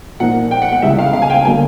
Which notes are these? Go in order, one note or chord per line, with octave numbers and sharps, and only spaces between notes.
A#2 F3 A#3 D#4 F#5
G5
F#5
F#5
C#2 C#3 E3 G3 E5
F5
F5
G#5
G5
D3 F#3 A#3 G#5